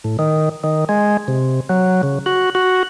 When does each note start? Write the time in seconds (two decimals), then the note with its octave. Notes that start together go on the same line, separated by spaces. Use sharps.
0.04 A2
0.19 D#3
0.64 D#3
0.89 G#3
1.28 C3
1.69 F#3
2.03 C#3
2.26 F#4
2.55 F#4